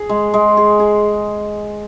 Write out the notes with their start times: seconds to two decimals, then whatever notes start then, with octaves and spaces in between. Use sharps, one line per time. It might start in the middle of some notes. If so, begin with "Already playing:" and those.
Already playing: G#4
0.09 G#3
0.34 G#3
0.57 G#4
0.79 G#4